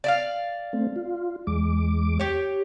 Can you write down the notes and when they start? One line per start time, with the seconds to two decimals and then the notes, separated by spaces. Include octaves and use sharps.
0.04 D5 E5 F5
0.73 A3 C4
0.96 F4
1.47 E2 G#3 D6
2.19 G4 C#5